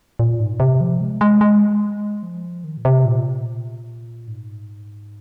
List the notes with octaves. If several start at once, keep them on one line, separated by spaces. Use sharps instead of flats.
A#2
G#2
C3
F3
G#3
G#3
G#3
F3
D#3
A#2
C3
A#2
G#2